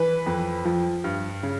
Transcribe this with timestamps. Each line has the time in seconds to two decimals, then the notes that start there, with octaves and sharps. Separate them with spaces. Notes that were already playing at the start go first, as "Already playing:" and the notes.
Already playing: E3 B4
0.26 F2
0.65 F3
1.04 G2
1.43 C#3